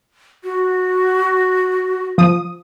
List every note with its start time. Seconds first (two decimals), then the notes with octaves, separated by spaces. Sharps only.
0.44 F#4
2.18 F3 D#6